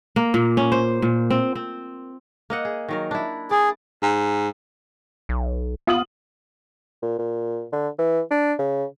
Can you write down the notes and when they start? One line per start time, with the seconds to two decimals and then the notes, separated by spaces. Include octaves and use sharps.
0.16 A#3
0.34 A#2
0.57 C#4
0.72 C5
1.02 A#2
1.30 C4
1.55 C4
2.50 A#3 D#5 F#5
2.65 G#4
2.89 D#3 F#3 A#4
3.11 D4 E4
3.51 G#4 D5
4.03 G#2
5.29 B1
5.87 B3 F4 D#6 F#7
7.02 A#2
7.19 A#2
7.73 D3
7.99 E3
8.31 D4
8.59 C#3